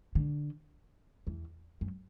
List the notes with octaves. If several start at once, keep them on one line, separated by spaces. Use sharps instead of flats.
D3
E2
F#2